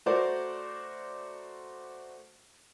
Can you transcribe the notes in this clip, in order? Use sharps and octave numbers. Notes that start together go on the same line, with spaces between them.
A3 F#4 A#4 C5 D5